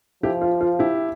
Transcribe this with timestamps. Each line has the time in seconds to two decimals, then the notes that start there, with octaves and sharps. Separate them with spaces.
0.23 F3 E4 G4
0.41 F4
0.61 F4
0.79 E4 G4